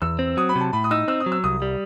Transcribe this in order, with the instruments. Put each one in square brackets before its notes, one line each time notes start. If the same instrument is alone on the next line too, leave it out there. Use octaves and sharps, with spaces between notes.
[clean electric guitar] E2 [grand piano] E6
[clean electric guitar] C4
[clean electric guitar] F#3 [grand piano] D#6
[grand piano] B5
[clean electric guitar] C3
[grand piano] A5
[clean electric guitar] A2 [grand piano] B5
[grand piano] D#6
[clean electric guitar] D#4 [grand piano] E6
[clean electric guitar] C4 [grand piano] E6
[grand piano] D#6
[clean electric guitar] F#3
[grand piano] E6
[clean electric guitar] C2 [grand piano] D#6
[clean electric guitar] G3